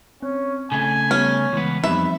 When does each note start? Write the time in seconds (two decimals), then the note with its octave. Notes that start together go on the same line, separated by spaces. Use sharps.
0.23 C4 C#4
0.72 C#3 A3 G#5
1.11 G3 B3 C#4
1.53 C#2 E3 B3
1.84 F2 G3 B3 C4 D#4 E5 B5